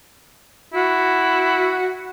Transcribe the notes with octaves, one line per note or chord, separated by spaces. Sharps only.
E4 F#4